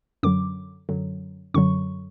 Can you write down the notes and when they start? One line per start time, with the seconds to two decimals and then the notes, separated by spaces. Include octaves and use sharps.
0.23 F#2 D3 F#3 D6
0.89 F#2 D3 F#3
1.54 F#2 D3 F#3 C#6